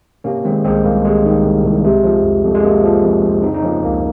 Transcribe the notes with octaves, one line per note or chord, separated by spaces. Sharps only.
C3 A#3 C#4
D#3 G#3 C4
C2 G#3 C4
C2 A#3
C3 G#3
D#3
C2
C2
C3
F3
F2
F2
G#3
C3 A#3
F3
F2
F2
C#3 C4 D#4
D#4
F3 A#3 C#4
C#2 A#3